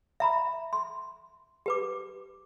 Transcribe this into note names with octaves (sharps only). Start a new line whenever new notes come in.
E5 A#5 B5
C6
G4 B4 D6